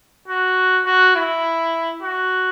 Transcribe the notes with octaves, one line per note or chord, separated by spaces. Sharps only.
F#4
F#4
E4
F#4